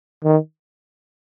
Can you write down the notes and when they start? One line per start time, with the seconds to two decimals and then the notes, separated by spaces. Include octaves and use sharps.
0.24 D#3